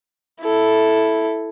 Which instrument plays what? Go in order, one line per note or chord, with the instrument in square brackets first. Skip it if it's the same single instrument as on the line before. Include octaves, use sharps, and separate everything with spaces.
[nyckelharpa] E4 A4